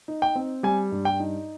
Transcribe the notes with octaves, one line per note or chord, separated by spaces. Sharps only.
D#4
G5
C4
G3 G#5
G2
G5
D#4